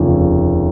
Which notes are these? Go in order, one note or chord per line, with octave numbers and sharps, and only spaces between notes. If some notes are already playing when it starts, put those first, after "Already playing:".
Already playing: F1 D#2 C#3 F3